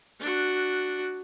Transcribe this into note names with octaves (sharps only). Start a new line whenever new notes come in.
D4 F#4